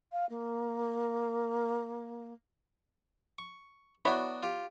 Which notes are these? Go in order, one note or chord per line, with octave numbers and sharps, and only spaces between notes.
F5
A#3
C#6
F#3 B3 D4 E4 F#4 C#5
F4 G4